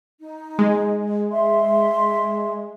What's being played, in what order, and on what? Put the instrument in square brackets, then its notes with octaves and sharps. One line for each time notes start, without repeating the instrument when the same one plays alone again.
[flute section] D#4
[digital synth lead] G#3
[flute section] E5 C6